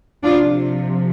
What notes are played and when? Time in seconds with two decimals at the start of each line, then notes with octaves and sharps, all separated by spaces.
0.24 C3 F3 D4 F4